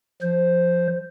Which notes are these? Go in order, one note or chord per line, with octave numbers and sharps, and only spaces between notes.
F3 C5